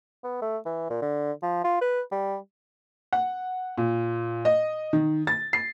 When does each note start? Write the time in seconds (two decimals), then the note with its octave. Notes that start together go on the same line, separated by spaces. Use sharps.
0.24 B3
0.42 A3
0.66 E3
0.90 A#2
1.02 D3
1.43 F3
1.64 F4
1.81 B4
2.12 G3
3.13 F#5
3.78 A#2
4.45 D#5
4.93 D#3
5.27 A6
5.53 C7